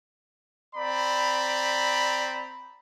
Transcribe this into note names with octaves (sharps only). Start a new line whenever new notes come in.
C4 D5 A#5 B5